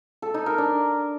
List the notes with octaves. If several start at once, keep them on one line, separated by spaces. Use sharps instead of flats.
A4
D#4
A#4
D4